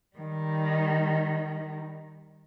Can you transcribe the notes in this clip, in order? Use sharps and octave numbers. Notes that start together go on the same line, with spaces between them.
D#3 G3